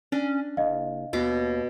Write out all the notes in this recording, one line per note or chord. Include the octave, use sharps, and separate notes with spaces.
C#4 D4
F#1 D#5 F5
D#2 B2 D6